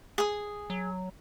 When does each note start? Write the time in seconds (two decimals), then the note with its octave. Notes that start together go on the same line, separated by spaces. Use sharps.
0.18 G#4 D#6
0.70 F#3